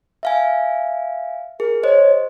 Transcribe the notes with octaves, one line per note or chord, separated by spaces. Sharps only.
E5 F5 G#5
G#4 A#4
C5 C#5 D#5